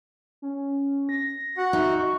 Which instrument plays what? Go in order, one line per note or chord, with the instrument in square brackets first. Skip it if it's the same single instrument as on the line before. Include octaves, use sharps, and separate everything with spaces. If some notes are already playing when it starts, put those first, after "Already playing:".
[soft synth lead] C#4
A#6
[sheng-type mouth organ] F#4 F#5
[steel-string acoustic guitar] D#4 [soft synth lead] E5
[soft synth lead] C#6